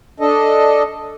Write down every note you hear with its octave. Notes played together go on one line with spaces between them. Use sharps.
D4 A4 D#5